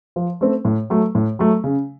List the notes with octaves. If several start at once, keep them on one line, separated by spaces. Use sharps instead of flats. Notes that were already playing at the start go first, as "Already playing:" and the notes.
F3
A3 C4
A2
F#3 A3
A2
F#3 A3
C#3